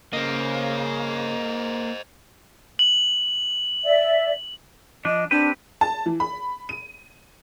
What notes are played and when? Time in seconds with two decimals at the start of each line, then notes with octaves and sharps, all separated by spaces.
0.13 C#3 A#3 C5 D#5
2.79 F#7
3.85 D5 E5
5.05 F3 D4 D#5
5.31 C4 D4 G4 B4
5.81 A5
6.06 E3
6.20 B5
6.69 D#7